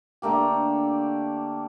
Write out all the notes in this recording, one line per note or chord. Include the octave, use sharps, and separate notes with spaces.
D3 A3 A#3 G4